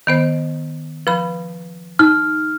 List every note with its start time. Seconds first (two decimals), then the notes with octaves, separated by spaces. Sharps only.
0.07 D#3 B3 C5
1.07 F3 B4 B5
1.99 D#4 F6